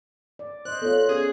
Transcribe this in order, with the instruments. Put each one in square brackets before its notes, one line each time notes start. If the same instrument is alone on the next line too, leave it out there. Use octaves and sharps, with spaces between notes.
[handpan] D5
[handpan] C5 D#5 [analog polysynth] F#6
[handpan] B3 F4 [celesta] A4 C#5
[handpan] C#4 [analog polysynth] G#4